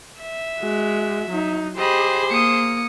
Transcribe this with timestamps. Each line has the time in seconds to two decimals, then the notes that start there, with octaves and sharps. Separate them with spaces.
0.22 E5
0.60 G#3 F#4
1.30 F#3 D#4
1.77 G4 G#4 C5 D#5 B5
2.30 A#3 D#6 C#7